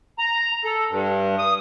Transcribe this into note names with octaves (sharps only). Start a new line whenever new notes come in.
A#5
A4
G2
D#6